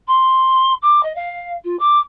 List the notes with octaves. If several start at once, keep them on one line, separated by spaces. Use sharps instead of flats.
C6
D6
D#5
F5
F4
D6